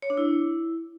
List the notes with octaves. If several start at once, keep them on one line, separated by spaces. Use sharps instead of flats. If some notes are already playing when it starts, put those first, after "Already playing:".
C#5
D4
E4